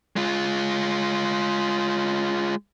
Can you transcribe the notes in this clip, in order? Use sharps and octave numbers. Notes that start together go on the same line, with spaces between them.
G#3 F4